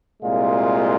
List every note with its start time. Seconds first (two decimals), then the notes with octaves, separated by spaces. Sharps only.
0.22 C2 A#2 G#3 F4